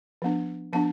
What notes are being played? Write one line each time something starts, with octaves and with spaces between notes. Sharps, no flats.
F3 B3 D4
F3 B3 D4 A5